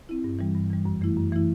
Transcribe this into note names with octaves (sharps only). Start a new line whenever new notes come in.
C4 E4
G2
E3 G3
G2
E3 G3
F#2
E3 A3 E4
F#2
E3 A3 E4